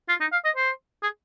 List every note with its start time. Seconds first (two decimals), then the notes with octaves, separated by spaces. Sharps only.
0.09 F4
0.21 D#4
0.33 F5
0.45 D#5
0.56 C5
1.03 G#4